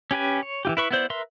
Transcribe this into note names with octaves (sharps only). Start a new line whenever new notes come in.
C#4 G4 B4 G#5
C#5
E3 F4 G4
E4 B4 C#6
B3 E4 C5 D5
A#4 B4 E5 C6